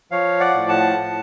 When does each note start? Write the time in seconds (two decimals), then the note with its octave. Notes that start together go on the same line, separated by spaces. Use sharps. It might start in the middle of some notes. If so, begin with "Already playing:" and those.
0.11 F3 C#5 F5
0.40 D5 F#5
0.55 A2
0.69 F#5 A5
0.98 A2